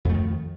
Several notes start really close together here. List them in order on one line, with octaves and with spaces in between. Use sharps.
F2 A3 D#3